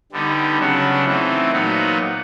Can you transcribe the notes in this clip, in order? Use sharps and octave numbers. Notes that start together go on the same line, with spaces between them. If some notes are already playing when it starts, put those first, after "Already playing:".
D3 G3 B3 D#4
C#3 F#3 B3 D4 F#4
E3 A3 C4 D#4
A#2 F#3 B3 D#4 F#4